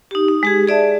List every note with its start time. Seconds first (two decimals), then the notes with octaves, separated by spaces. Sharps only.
0.11 D#4 G4
0.28 D#4
0.43 G#3 G4 G#4
0.68 G#4 D5 E5 A5